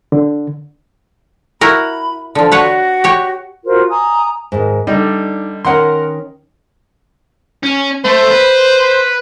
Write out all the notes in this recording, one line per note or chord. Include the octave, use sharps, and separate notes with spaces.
D3
E4 F#4 A#4 B5
D3 F3 D5
F#4 B4 C#5 F#5
G4 C#5
F4 F#4 A#4 C5
G#5 A#5 D#6
G#2 D#3
D3 G3 D#4
D#3 C#4 A#4 F#5 C6
C#4
A3 C5
B4